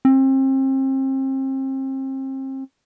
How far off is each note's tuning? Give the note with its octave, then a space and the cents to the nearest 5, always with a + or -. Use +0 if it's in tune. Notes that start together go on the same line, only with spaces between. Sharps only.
C4 +35